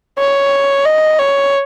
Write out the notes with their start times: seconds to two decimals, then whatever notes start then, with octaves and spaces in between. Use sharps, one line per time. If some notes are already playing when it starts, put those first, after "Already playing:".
0.18 C#5
0.85 D#5
1.19 C#5